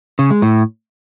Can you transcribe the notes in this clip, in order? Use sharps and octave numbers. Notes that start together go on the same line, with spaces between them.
C#3
G#3
A2